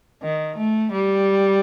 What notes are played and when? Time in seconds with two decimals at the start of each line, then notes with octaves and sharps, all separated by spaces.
0.22 D#3
0.57 A3
0.92 G3